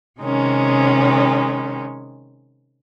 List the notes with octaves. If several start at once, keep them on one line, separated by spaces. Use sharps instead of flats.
C3 D#3 G#3 C#4